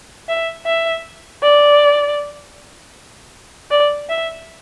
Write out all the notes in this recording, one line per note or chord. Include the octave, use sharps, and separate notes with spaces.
E5
E5
D5
D5
E5